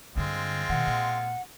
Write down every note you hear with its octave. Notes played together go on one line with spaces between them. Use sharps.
G2 D3 G#3 C4 F4
B2 D#3 F#5
A#2